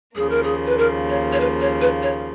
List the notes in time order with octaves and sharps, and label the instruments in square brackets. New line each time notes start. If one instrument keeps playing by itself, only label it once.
[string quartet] D#2 C#3 F3 A#3 [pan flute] G#4
[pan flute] A#4
G#4
B4
A#4
C#5
C#5
B4
C#5
B4
C#5